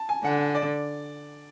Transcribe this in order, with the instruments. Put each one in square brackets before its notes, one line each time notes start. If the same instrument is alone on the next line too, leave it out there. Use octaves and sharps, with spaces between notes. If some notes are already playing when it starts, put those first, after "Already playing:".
Already playing: [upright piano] A5
G#5
[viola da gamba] D3 [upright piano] F#5
[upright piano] D5